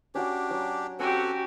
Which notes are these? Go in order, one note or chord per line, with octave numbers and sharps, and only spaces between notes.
C#4 D4 F#4 G4 F#5
F#3
C4 C#4 F#4 G4 A4 F#5